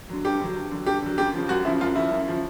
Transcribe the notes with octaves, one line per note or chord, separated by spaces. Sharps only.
D3 F#3
G2 G4
D3 F#3
G2
D3 F#3
G2 G4
D3 F#3
F#2 G4
C#3 F3
F#2 F#4
C#3 F3 E4
F#2 F4
C#3 F3 E4
F#2
C#3 F3